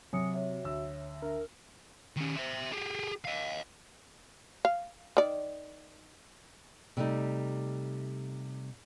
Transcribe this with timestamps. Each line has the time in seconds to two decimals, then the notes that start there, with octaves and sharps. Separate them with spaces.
0.13 C3 F#3 G#5 D#6 C#7
0.34 C#5 E5
0.64 D2 E6
1.22 D4 A#4 E5
2.16 D#3 C#4
2.36 C5 E5
2.72 G4 G#4
3.25 D#5 F5
4.65 F5
5.17 D#3 D5
6.97 C3 G3 A3 D#4